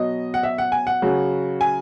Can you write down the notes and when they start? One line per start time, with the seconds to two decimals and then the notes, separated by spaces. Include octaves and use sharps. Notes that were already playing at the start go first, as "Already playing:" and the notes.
Already playing: B2 F#3 D#5
0.34 F#5
0.43 E5
0.58 F#5
0.72 G#5
0.87 F#5
1.02 C#3 F#3
1.61 G#5